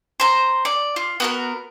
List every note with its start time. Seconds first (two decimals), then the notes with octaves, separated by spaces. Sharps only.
0.20 C5 A#5
0.65 D5
0.96 F4
1.20 B3 F#4 A#4